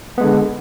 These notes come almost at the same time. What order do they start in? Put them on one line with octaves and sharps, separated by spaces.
B3 G#3 D3